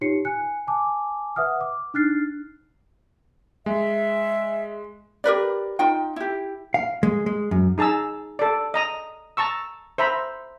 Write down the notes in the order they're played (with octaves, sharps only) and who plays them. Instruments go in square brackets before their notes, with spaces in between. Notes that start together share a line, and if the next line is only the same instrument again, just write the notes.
[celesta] D#4 F4 G4 C#5 C7 C#7
G#5 F#6 C#7
G#5 A5 D6
B4 E5 F#5 D#6 F6
D6
D4 D#4 F6 F#6 A6 C7
[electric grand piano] G#3 [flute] E5
[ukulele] G4 A#4 B4 D5
D#4 F4 G5
E4 G4
[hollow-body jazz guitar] F5
G#3
G#3
F#2
[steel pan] D#4 G#4 A5 A#5 E6
A4 D5
D#5 A#5 D#6
A5 A#5 C#6 E6
C5 E5 A#5 B5